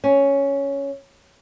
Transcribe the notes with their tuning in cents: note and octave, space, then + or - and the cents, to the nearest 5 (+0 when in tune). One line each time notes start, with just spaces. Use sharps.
C#4 +5